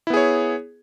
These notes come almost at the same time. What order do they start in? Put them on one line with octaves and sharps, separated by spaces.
E4 B3 G#4 C#5